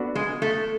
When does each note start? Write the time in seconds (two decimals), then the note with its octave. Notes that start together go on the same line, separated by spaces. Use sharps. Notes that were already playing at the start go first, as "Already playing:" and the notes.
Already playing: B3 D4 F#4 A4
0.15 G#3
0.42 A3